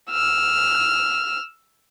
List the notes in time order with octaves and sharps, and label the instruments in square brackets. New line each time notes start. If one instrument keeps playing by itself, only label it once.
[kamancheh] E6 F6